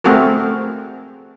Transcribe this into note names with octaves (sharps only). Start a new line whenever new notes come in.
A3 C4 F#4 G#4 A#4